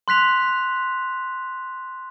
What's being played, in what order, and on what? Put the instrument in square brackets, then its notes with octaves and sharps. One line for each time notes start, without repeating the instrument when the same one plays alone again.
[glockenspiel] C6 F#6 B6 F7